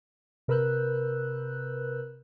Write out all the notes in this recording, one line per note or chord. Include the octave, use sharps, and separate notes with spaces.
C3 A#4 B4 E6 F#6 G6